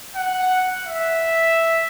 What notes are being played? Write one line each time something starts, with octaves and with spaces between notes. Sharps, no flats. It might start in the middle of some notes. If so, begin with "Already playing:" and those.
F#5
E5